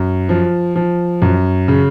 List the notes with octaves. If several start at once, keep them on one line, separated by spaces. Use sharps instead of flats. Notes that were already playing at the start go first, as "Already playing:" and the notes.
Already playing: F#2
F3
F3
F#2
C#3